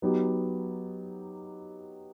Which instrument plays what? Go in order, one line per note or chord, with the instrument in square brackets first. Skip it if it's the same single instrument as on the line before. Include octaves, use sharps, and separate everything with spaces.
[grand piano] F#3 B3 D#4 G4